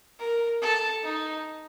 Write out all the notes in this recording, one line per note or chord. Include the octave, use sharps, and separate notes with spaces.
A#4
A4
D#4